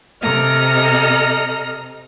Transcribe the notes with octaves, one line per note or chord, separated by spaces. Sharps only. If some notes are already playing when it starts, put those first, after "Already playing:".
C3 A4 D#5 A#5 F6